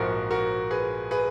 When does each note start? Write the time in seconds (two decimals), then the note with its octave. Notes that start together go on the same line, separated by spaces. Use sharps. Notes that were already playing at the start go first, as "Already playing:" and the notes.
Already playing: A#1 G#2 F3 F#4 A#4
0.31 F#4 A#4
0.71 G#4 B4
1.11 G#4 B4